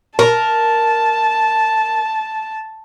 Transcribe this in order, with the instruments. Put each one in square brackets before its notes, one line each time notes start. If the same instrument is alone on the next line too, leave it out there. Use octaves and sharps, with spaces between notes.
[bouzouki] A#4 [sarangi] A5